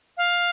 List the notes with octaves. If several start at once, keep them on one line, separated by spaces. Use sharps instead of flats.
F5